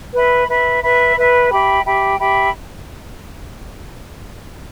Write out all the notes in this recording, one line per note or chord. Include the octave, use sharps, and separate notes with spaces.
B4 E5 B5
B4 E5 B5
B4 E5 B5
B4 E5 B5
G4 E5 G5 B5
G4 E5 G5 B5
G4 E5 G5 B5